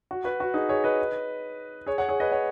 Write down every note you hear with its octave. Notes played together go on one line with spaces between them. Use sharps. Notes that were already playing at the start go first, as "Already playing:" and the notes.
F#4
F#4 B4
F#4
D#4 G#4
G#4 C#5
B4 D#5
G#4 C#5
C#5 F#5
G#4 C#5
B4 D#5
C#5 F#5